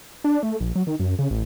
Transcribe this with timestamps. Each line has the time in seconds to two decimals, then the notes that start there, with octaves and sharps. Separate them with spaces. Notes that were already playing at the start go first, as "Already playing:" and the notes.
0.24 D4
0.43 A3
0.61 A#1
0.76 F#3
0.87 D#3
1.00 F#2
1.19 C#3
1.31 A1